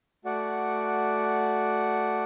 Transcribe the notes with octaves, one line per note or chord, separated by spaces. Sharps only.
A3 F#4 D5 F#5